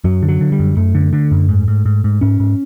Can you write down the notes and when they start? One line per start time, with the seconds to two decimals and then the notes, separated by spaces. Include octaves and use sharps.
0.04 F#2 F#3
0.23 D3
0.28 F#3
0.41 D3
0.52 G3
0.59 F#2
0.77 F#2 A3
0.95 D3
1.13 D3
1.31 F#2
1.49 G#2
1.68 G#2
1.85 G#2
2.04 G#2
2.21 G#2 C#4
2.40 G#2